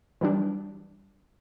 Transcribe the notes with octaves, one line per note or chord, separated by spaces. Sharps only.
E3 F#3 G3 D4